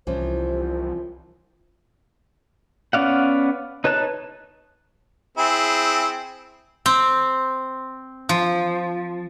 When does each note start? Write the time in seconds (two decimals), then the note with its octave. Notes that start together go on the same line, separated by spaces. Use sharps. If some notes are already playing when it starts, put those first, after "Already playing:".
0.07 C2 E3 F3 C#4 C5
2.93 B3 C#4 D5 F5 F#5
3.84 D#4 B4 C#5 A5 F#6
5.37 C4 E4 G#4
6.86 C4
8.29 F3